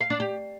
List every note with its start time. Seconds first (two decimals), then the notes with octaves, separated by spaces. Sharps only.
0.01 F5
0.10 D4
0.20 G4